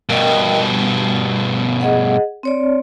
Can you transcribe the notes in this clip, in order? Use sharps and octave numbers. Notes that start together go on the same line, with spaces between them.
G2 B2 A#4 D#5 G5
G3
G#4 D#5 F#5
C4 C#5 D5